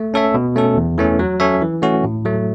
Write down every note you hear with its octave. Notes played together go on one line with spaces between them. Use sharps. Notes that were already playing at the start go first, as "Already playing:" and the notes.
Already playing: A3
C#4 A4 C#5 E5
B2
A3 C#4 A4
E2
E3 A3 C#4
F#3
C#4 A4 C#5 E5
E3
A3 C#4 F#4
A2
F#3 A3